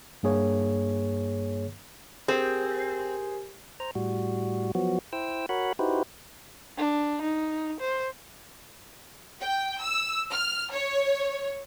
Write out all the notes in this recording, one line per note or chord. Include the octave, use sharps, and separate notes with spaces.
G2 A#3 G#4 C#5
C4 G4 G#4 A#4 C5 G#5
C5 A#5
A2 G3 F#4
F3 F#3 B3 F#4
E4 C5 G5 E6
F#4 A#4 C#5 F#5 B5
D#4 E4 F#4 G4 B4 C5
D4
D#4
C5
G5
E6
F6
C#5